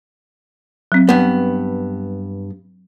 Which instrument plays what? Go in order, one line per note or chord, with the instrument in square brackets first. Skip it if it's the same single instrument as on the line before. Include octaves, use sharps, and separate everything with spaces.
[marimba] F#3 C4
[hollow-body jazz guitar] G2 B3